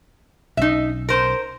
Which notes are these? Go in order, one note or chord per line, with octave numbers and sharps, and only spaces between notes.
B1 C4 C#4 D#4 E5
A#4 C5